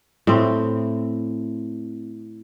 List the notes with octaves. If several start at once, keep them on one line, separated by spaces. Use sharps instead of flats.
A2 C4